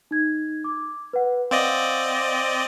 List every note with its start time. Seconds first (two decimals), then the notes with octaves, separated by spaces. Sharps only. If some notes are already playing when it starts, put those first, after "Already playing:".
0.11 D#4 G#6
0.64 D6
1.13 B4 F#5
1.51 C4 D5 D#5 F5 F#5